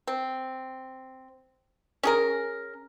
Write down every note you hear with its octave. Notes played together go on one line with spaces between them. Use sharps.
C4
C#4 G#4 A#4